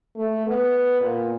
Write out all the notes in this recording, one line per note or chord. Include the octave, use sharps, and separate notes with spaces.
A3
B3
A#2